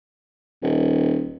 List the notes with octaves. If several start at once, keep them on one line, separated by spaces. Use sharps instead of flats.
D#1